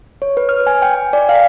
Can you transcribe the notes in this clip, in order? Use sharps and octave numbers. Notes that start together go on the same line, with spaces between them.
C#5
B4
F6
G#5
G5
G#5
D5
F5